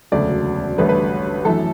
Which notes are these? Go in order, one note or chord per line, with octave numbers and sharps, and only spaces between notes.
E1 D2 C#3 F#3 A3 D5
A1 G2 D3 A3 B4
B4
F#2 E3 A3 A4